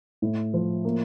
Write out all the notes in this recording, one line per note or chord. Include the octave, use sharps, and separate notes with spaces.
A2
F3
A#3